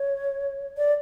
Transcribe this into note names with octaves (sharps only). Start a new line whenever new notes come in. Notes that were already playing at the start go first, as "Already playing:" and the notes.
Already playing: C#5
D5